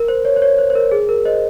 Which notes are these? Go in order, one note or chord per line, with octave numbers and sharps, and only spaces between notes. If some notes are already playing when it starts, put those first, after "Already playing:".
Already playing: A#4
C5
C#5
C5
C#5
C5
C5
A#4
G#4
A#4
C5 D#5